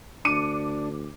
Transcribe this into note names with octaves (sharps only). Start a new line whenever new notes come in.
D2 D4 D6 C#7 D#7